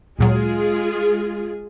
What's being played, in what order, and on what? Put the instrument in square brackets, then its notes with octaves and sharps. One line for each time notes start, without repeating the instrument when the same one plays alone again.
[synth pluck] D2 A#2 F#3 [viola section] G#3 F4 G#4